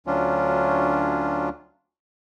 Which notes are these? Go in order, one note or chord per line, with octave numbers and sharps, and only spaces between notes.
D2 F#3 C#4 D4 F4